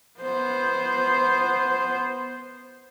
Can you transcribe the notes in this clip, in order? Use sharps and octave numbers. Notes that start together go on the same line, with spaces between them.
B3 C5